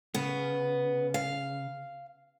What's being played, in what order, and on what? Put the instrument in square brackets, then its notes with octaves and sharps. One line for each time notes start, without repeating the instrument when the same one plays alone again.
[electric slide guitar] C#3 [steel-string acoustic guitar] B3
[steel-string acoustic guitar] F5